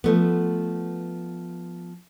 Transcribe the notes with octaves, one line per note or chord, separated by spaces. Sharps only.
F3 A3 B3